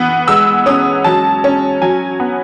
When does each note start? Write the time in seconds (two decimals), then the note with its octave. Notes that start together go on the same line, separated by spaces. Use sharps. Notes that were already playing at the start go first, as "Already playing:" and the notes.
Already playing: E3 B3
0.28 G#3 E6
0.66 C#4 D#6
1.04 F#3 A5
1.44 C#4
1.82 F#3 G#5
2.20 B3